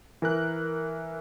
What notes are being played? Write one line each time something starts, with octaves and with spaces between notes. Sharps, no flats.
E3 A#4 F#6